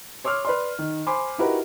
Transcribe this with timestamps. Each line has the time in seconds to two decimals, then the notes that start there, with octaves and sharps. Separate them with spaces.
0.24 C#5 C6 D6 E6 F6
0.45 B4 D5 C6
0.79 D#3
1.06 C5 G#5 B5 C6 D6
1.38 D#4 E4 F#4 G4 A#4 B4